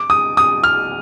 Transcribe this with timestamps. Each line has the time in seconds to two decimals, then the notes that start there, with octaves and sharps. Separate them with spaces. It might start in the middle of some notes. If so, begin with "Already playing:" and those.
Already playing: D6
0.10 D#6
0.37 D#6
0.64 F6